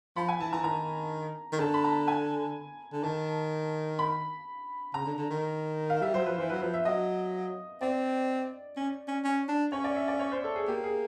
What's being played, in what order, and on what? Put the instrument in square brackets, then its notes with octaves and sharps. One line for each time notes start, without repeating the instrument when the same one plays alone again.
[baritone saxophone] F3 [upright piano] B5
[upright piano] G#5
[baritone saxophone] E3 [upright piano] A5
[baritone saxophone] E3 [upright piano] A#5
[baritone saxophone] D#3 [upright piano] A#5
[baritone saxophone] D#3
[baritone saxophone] D3 [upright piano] A5
[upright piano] B5
A#5
G#5
[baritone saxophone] D3
[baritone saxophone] D#3 [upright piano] A5
[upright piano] B5
[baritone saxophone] C#3 [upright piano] A#5
[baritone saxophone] D3
D3
D#3
[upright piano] F5
[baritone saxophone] G3 [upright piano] E5
[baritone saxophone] F#3 [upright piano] C5
[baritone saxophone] F3 [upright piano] B4
[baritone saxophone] E3 [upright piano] C5
[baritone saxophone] F#3 [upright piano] B4
[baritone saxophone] F3 [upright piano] B4
[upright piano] E5
[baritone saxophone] F#3 [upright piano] D#5
[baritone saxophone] C4 [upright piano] D5
[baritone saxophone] C#4
C#4
C#4
D4
[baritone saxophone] C#4 [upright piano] C#5
[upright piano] D5
E5
D5
C#5
C5
A4
G#4
[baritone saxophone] A#3 [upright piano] G4
[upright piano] G#4